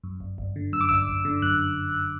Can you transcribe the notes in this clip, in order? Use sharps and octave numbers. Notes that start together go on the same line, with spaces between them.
F#2
G1
G1
D3
F#2 E6
D6
G1 E6
G1
D3
F#2 F#6